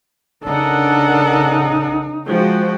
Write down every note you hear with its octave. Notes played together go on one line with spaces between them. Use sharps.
C#3 D4 D#4 A4 A#4 F#5
F3 G#3 F#4 G5